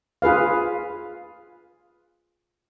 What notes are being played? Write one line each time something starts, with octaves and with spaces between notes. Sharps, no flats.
F4 G#4 B4 F5